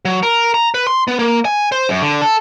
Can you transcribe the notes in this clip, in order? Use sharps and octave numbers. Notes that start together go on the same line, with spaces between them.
F#3
A#4
A#5
B4
C6
B3
A#3
G#5
C5
F#2
D3
A4